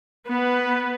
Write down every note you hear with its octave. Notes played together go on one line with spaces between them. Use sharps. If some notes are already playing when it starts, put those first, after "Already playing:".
B3 B4